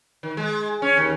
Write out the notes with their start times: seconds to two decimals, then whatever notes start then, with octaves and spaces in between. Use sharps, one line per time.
0.23 D#3
0.37 G#3
0.82 C#4
0.97 D#2